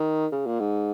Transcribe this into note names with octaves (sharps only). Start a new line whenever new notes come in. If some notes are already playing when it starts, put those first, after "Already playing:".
Already playing: D#3
C#3
A#2
G#2